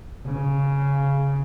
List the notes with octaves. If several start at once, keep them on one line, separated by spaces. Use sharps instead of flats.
C#3